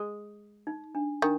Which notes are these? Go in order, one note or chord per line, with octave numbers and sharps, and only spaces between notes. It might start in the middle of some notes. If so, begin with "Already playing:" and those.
Already playing: G#3
D#4
D4
D#3 D4